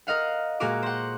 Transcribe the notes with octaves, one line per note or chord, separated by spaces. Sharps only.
A#4 D#5 F5 F#5
A#2 G#3 A#3 F#4 A#4 D6
C5 F#5